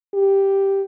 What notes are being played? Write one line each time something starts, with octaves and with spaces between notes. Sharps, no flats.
G4